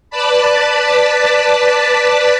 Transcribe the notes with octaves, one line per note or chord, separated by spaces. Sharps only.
B4 D5 A5 B5